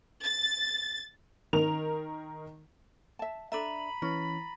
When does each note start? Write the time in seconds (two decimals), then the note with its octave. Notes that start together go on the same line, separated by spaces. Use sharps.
0.23 A6
1.53 D#3 A#4 F7
3.19 E5 A5
3.52 D4 A4 E5 A#5 B5 D#7 F#7
4.02 E3 C#4 A6 A#6